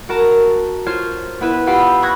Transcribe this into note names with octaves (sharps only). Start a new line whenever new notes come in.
F#4 A#4 A5 A#5
F4 C5 C#5 F6
B3 E4 B4
F4 G4 F5 F#5 B5 E6
B5 C#6 D#6 F#6 G#6 A#6